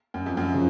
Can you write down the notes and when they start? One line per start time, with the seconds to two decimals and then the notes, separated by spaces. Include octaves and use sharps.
0.14 F#2
0.26 F2
0.37 F#2
0.54 C#3 F3